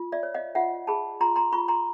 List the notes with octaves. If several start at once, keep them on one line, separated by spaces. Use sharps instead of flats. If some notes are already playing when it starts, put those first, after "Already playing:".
Already playing: F4
D5 E5
C#5
D#5 F5
F4 E5 F#5
G#4 A5 B5
F4 A#5 C6
A#5 C6
F4 B5 C#6
A#5 C6